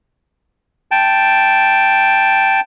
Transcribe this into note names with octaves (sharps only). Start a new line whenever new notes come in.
G5 A5